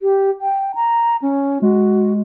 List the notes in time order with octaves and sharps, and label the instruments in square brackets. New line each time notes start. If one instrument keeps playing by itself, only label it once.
[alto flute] G4
G5
A#5
C#4
[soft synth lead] G#3 [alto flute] F#4